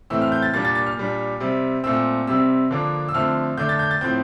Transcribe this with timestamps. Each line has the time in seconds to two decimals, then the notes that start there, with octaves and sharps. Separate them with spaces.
0.10 A2 E3 A3 C4 E6
0.22 F6
0.32 G6
0.42 A6
0.54 A#2 G3 A#3 D4 A6
0.65 A6
0.75 A6
0.86 F6
0.97 A#2 G3 D4
1.40 C3 G3 C4
1.84 A#2 A3 C4 E6
2.27 C3 G3 C4 E6
2.71 D3 F3 A#3 D4
3.09 E6
3.14 D3 F3 A3 C4 F6
3.58 D3 A3 D4 G6
3.69 A6
3.79 G6
3.91 A6
4.01 A2 F3 C4 G6